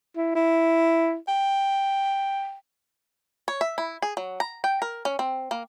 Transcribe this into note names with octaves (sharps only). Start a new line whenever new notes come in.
E4
E4
G5
C#5
E5
E4
G#4
F#3
A#5
G5
A#4
C#4
C4
A#3